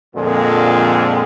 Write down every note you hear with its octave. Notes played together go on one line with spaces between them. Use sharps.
F2 A#2 D3 F3 G#3